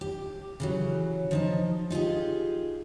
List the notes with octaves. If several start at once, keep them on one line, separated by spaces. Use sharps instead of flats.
G4
C#3 E3 F#3
F3 D#4 A5
D#4 F4 G4 G#4